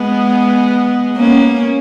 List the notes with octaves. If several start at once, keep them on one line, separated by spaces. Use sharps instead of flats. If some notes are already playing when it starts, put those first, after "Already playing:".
Already playing: G#3 B3
A#3 C#4